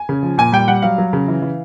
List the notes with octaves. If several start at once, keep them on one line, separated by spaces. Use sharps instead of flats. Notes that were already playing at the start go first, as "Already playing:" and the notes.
Already playing: G#5
C#3
F3
A#2 G#5
G3 G5
G3 F#5
F#3 F5
F#3
C#3
E3
E3